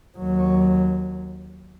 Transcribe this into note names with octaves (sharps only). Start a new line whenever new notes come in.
D#2 F#3